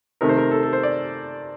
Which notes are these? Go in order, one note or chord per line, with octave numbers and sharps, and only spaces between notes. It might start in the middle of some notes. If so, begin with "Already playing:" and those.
C3 D#3 A3 A#4
C5
A#4
A4
A4
C5
D5